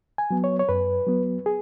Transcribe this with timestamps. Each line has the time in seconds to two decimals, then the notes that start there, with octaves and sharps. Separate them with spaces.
0.18 G#5
0.31 F#3 B3
0.44 C#5
0.59 C#5
0.69 F#2 B4
1.07 F#3 B3
1.46 G#4